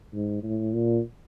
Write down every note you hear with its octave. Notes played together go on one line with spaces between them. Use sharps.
G#2
A2
A#2